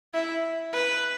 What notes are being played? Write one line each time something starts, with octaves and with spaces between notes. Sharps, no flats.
E4
B4